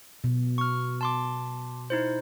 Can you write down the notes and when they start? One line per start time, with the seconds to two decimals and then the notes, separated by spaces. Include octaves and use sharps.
0.24 B2
0.58 C#6 F6
1.01 A5 C6 D6
1.90 D#4 E4 C5